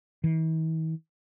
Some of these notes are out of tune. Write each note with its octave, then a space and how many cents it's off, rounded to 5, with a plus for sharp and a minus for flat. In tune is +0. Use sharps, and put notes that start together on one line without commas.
E3 -45